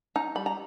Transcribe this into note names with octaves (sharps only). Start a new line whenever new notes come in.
D#4 A#5
G3 B5
A#5